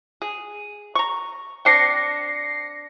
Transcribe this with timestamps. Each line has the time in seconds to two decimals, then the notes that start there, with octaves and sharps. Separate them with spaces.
0.22 G#4
0.95 A#5 C#6
1.65 C4 D4 G5 A#6 C7 C#7